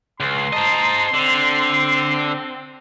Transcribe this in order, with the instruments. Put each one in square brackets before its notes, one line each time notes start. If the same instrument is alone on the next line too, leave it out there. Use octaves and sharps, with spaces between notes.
[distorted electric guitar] C#2 [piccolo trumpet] C6
[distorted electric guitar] C5 D#5 [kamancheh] A5 A#5
[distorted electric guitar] D3 [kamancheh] C4